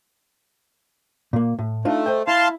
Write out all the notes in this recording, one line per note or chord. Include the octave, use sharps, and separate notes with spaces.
A#2 A#3
A2
A3 D4 D#4 F4
C5 D#5 G5
E4 F5 A5 C6